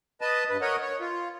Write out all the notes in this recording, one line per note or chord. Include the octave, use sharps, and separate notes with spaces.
B4 D#5 A5
G2 B4
A#4 C#5 D#5 F#5
C#5
F4